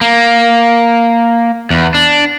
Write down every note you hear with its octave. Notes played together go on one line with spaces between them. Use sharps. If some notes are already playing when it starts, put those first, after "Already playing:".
A#3
E2
D4